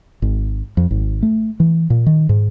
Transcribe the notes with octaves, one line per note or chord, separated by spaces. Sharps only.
G#1
F2
G#1
A3
E3
A#2
D#3
G#2